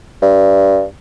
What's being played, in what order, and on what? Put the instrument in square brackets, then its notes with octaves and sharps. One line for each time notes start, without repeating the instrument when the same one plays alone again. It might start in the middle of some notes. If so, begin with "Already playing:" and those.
[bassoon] G2